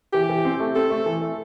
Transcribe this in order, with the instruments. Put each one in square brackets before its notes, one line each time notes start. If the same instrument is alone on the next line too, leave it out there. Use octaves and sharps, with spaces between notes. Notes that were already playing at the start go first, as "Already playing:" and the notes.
[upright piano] E3 [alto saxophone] G4
[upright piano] E3
C4
A3
[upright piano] C4 [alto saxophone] A4
[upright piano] A3
E3
A3